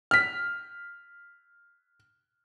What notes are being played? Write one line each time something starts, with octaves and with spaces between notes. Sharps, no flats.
F6 B6